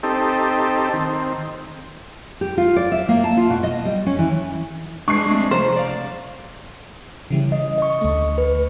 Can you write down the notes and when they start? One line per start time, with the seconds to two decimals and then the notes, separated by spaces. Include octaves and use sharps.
0.03 C4 D#4 G4 A4
0.93 D#3 C4
2.41 G4
2.58 F4
2.76 D5
2.92 E5
3.09 A#3
3.24 A5
3.37 F4
3.50 B2
3.63 D#5
3.85 G3
4.06 C#4
4.19 E3
5.08 G#3 D4 C#6 C7
5.30 G3 A3 C4
5.51 C2 F3 C5 A#5
5.76 D5 F5
7.30 C#3 E3 G3
7.52 C#3 D#5
7.78 D#5 C#6
8.01 D2 A3
8.38 B4